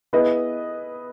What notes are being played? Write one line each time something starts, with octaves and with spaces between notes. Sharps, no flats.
B3 E4 G#4 B4 D#5